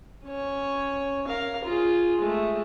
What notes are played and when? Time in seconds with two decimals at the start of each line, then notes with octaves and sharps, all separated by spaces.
0.24 C#4 C#5
1.27 A#4 F5
1.64 F4 G#4
2.21 G#3 A3